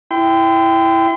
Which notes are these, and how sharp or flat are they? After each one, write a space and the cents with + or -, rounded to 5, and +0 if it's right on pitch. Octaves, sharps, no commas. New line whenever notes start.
E4 +5 G5 +0 C6 -40